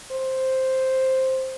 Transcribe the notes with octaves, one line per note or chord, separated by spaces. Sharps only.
C5